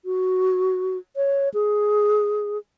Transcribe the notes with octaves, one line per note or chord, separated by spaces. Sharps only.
F#4
C#5
G#4